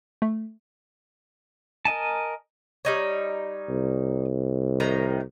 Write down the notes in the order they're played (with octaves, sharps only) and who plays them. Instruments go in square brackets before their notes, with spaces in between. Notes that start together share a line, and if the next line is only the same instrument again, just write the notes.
[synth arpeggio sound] A3
[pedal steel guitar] A#4 D#5 G#5 A5
[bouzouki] G3 D#4 C#5
[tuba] C2
[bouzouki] A2 D#3 A#5